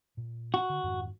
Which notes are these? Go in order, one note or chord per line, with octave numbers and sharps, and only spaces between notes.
A#2
F#4
D3
F2 G#2 D#3